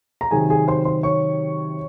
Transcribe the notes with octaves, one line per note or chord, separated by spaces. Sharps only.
A#5
C3 D#3 F#3 G#4 G#5
G#4 G#5
C5 C6
C5 C6
C#5 C#6